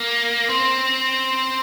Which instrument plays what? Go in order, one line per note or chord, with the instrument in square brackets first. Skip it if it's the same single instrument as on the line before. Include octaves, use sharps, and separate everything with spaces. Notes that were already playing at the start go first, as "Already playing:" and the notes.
Already playing: [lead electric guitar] A#3
C4